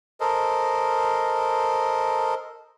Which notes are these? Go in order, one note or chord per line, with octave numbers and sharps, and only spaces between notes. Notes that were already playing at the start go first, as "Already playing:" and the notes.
A4 A#4 C5 D#5